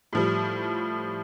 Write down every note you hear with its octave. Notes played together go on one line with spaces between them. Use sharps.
A2 F3 G3